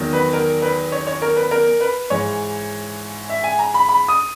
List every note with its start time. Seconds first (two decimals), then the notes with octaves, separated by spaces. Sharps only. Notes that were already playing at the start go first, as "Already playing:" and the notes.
Already playing: E2 D#3 F#3
0.13 B4
0.33 A#4
0.62 B4
0.92 C#5
1.07 C#5
1.22 A#4
1.36 B4
1.51 A#4
1.81 B4
2.10 G#2 E3 C#5
3.29 E5
3.44 G#5
3.59 A#5
3.74 B5
3.89 B5
4.08 D#6